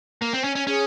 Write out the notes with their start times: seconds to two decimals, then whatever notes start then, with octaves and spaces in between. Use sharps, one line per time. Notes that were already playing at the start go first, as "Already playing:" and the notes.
0.22 A#3
0.33 C4
0.44 C#4
0.55 C#4
0.67 C#4 G#4